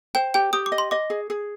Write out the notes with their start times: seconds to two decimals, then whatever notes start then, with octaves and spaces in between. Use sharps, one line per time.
0.15 C5 G5
0.34 G4 G5
0.53 G4 D#6
0.66 D6
0.72 D#5
0.78 C6
0.91 D#5 D6
1.10 G#4
1.30 G#4